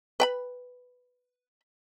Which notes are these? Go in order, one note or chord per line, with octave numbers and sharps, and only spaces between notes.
B4 G5 B5